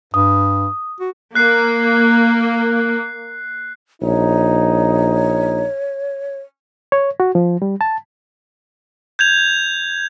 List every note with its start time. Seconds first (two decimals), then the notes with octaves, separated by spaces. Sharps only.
0.14 G2 D#6
1.00 F#4
1.35 A#3 F#6 C7
4.02 A#1 D#4 C#5
6.92 C#5
7.20 F#4
7.35 F3
7.62 G3
7.81 A5
9.19 G6 G#6 F7